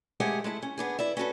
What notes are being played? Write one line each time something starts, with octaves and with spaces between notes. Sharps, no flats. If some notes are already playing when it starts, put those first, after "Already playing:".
G#3 A3 G4 G#4 C5 F#5
G#3 A3 E4
C#4
B3 D4 G#4
E4 D5 E5
C#4 F#4 A4 B4